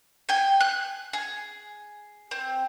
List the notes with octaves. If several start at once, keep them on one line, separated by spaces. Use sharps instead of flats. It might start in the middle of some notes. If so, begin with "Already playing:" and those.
G5 G#5
F#6
G#4
C4